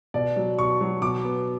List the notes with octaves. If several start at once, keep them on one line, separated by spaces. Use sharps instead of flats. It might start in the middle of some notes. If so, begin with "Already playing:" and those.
B2 D5
F#3
B2 C#6
F#3
B2 D6
B3